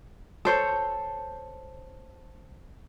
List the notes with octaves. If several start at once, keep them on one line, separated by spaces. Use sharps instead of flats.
A4 C5 C#5